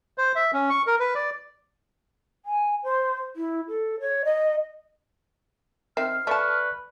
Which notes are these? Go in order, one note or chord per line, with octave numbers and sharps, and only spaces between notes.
C5
E5
C#4
C#6
A#4
B4
D5
G#5
C5
E4
A4
C#5
D#5
D#3 C4 E5 F6 C7
A3 B4 D5 A5 C#6